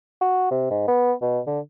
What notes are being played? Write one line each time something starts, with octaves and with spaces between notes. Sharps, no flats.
F#4
C3
G#2
B3
B2
D3